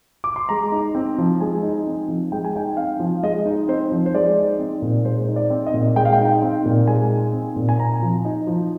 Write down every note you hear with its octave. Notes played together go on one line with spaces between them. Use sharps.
D6
C6
G#3 A#5
D#4
C4
F3
G#3 G#5
D#4
C4
F3
G#3 G5
G#5
D#4 G5
C4 F5
F3
G#3 D#5
D#4
C4 C5
F3
C5
G#3 D5
D#4
C4
A#2
G#3 C5
D#4
D5
C4
D#5
A#2
G#3 G5
F5
G5
D#4
C4
A#2
G#3 G#5
D#4
C4
A#2
G#5
C4 A#5
F3
D#4
F3